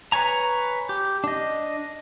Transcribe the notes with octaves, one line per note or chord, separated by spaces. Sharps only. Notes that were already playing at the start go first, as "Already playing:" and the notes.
B4 C#5 G#5 A#5
G4
D4 D#5